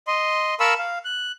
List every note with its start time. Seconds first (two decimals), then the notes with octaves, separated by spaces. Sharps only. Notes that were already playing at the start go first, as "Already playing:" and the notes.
0.07 D#5 C6
0.60 A#4 F5 A5 B5 C#6 E6
0.78 F5
1.05 F#6